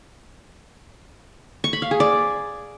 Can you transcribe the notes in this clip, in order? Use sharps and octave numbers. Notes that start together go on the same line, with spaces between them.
C#6
B5
F5
G#4
D5